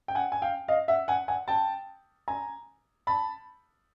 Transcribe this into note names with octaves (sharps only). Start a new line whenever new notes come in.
G5
F#5 G#5
G#5
F5 G5
D#5 F5
E5 F#5
F#5 G#5
F#5 G#5
G5 A5
G#5 A#5
A5 B5